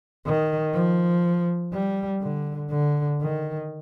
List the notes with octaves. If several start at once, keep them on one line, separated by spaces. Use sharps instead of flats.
D#3
F3
G3
D3
D3
D#3